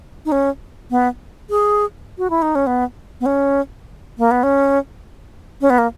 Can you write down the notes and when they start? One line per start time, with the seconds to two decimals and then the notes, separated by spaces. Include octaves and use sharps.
0.25 D#4
0.32 C#4
0.90 B3
1.50 G#4
2.18 F#4
2.30 E4
2.42 D#4
2.55 C#4
2.67 B3
3.20 B3
3.26 C#4
4.18 A#3
4.31 B3
4.43 C#4
5.61 C#4
5.70 B3
5.78 A#3